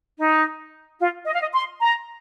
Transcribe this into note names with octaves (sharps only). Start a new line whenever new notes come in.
D#4
F4
D#5
F5
D#5
C6
A#5